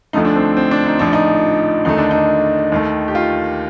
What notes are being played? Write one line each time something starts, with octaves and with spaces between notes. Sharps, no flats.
D2 D3 F3 A3 D#4
D4
C4
C4
D4
D#4
A#1 A2 F3 D4
D#4
D#2 D3 A3 D#4
D4
D#4
D#2 D#3 A3
G4
F4